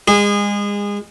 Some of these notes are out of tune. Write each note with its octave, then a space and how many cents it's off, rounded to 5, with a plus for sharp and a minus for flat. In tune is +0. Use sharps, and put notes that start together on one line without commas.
G#3 -30 G#4 -25